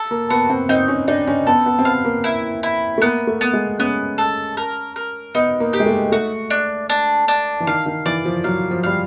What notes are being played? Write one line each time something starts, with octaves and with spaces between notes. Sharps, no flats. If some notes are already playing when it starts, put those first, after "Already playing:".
Already playing: A4
A#3
B3 F#4
C4
C4 D#4
C#4
D4 D#4
C#4
B3 A4
B3
C4
B3 F5
A#3
E4
E4
A3
A#3 B3
A3
B3
G#3
B3 C#4
A4
A#4
A#4
B3 D#4
A#3
G4
G#3
A3
A3 F#4
D4
D4
D4
E3
D#3 F5
D#3
E3 D5
F3
F#3 F5
F3
G3 F5